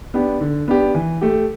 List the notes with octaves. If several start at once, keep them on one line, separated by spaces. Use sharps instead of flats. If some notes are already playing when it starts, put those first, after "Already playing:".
B3 D4 G4
D3
B3 D4 G4
E3
A3 G4